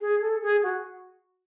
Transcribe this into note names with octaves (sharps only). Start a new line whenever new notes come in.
G#4
A4
G#4
F#4